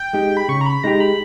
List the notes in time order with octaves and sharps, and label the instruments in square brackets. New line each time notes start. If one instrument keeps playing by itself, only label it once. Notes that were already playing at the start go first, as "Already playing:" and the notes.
Already playing: [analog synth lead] G5
[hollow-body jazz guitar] G#3 D#4 G4
[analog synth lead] B5
[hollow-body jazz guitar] C#3 [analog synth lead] C#6
[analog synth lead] A#5
B5
[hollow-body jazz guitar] G#3 D#4 G4 [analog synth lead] A#5
[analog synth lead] B5